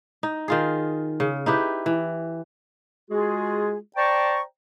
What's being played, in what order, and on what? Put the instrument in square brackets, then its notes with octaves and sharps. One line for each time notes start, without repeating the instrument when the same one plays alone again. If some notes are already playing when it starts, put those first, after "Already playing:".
[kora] D#4
D#3 F4 G#4
C#3
D#4 E4 G4 B4
E3
[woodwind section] G#3 F4 F#4 G#4
C5 D5 G5 A5 A#5 C#6